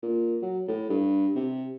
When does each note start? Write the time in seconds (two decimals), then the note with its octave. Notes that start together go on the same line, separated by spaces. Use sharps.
0.03 A#2
0.42 F#3
0.68 A2
0.89 G2
1.35 C3